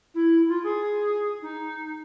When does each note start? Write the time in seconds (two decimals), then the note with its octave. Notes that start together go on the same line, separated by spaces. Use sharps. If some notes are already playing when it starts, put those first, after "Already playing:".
0.14 E4
0.48 F4
0.63 G#4
1.42 D#4